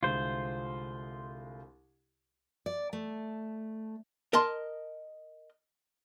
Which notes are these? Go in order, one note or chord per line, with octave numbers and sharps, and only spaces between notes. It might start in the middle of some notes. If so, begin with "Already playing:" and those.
C2 D3 G#3 F4 C5
D5
A3
A#4 D#5 A5 C6